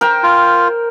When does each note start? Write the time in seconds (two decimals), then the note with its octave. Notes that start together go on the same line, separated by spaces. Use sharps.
0.01 A#4 C5 G5
0.23 F4